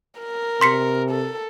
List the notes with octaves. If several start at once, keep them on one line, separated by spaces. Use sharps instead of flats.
A#4
C3 C6 B6 C#7
A4